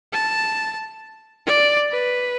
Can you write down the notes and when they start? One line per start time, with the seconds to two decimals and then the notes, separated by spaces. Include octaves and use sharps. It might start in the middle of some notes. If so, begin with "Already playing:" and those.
0.13 A5
1.46 D5
1.92 B4